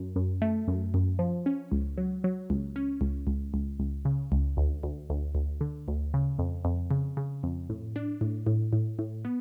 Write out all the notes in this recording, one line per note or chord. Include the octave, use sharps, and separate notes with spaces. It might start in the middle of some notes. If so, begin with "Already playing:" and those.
Already playing: F#2
F#2
A3
F#2
F#2
F3
C#4
C#2
F#3
F#3
C#2
C#4
C#2
C#2
C#2
C#2
C#3
C#2
D2
D2
D2
D2
D3
D2
C#3
F2
F2
C#3
C#3
F2
A2
D4
A2
A2
A2
A2
B3